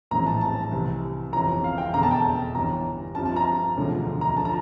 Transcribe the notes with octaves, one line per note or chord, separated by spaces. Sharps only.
A#1 A2 E3 G3 C4 A#5
A5
A5
C2 C3 E3
G1 F2 E3 A#5
F5
G5
E1 E2 D3 A#5
A5
G5
A5
G1 G2 E3 A#5
G2 F3 C4 A5
A5
A#5
E1 D2 D3 F3
A#5
D3 F3 A5
A#5